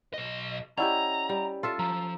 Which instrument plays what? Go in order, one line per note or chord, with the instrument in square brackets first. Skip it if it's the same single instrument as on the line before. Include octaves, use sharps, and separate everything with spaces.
[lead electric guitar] B1 D#5
[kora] C#4 E4 G4 [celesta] D5 D#5 F#5 [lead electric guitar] A#5
[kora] G3
[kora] F4 A4 E5 [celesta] A5
[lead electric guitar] F3 [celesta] A#5